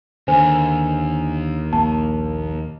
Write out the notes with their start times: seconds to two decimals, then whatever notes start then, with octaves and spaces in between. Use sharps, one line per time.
0.28 D#2 D3 C5 G#5
1.73 A#1 A#3 A5